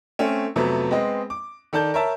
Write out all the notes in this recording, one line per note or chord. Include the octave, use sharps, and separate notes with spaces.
A3 C4 C#4
F2 C3 F#3 A3 B3
G#3 B3 C4 D#5
D6
D#3 A4 D5 A5 G6
A#4 C#5 E5 A5